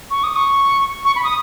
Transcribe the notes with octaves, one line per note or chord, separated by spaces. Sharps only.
C#6
D#6
C#6
C#6
B5
D#6